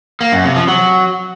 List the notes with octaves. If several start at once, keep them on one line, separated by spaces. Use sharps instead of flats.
A#3
F#2
C3
F3
F#3